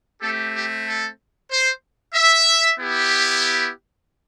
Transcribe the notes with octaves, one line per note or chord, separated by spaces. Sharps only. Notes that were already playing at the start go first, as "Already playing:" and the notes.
A3 C4 G4 A4
G4
A4
C5
E5
B3 E4 G4